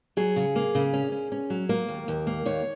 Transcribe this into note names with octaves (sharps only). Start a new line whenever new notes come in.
F#3 G#4
C#3
A#3
C#3
C#4
C#4
C#4
F#3
A#3 A#4
D#2
D#2
A#3
D#2 C#5